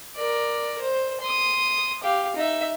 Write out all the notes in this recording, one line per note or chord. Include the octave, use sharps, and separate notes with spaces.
A#4 D5
C5
C6 D#6
G4 F5
D#4 E5